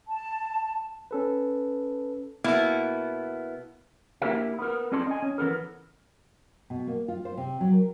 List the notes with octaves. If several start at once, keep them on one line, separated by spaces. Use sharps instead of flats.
A5
C#4 A4 B4
B2 A#3 B3 E4
A#3 D4 E4 G4 A#4 E5
B3 A#4
C4 C#4 A4 D5 A5 C6
D#5 G#5
C#4
E3 B3 A4 A#4
B2
A#3
F4
C5
C3
F#3
A#4